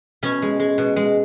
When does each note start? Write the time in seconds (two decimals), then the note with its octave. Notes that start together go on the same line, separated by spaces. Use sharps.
0.23 B2 C#4
0.42 G#3
0.60 G#3
0.78 B2
0.96 G#3